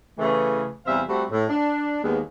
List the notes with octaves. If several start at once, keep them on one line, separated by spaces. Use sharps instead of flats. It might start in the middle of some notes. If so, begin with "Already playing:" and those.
C#3 E3 A3
E2 C3 G3 C5 E5 F5
G3 A3 C4 F#4
A2
D4
D#2 G#3 B3